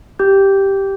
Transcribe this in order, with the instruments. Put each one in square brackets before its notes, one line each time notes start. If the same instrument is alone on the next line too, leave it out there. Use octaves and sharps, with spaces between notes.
[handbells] G4 G6